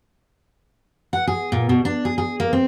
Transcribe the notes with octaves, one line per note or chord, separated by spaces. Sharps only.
F#5
G#4
A#2
B2
D4
G#4
G#4
A#3
C4